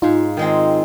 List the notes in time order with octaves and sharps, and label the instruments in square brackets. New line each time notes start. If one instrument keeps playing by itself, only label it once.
[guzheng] G#2 [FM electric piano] D#4 F4
[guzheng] D#3 G#3 C4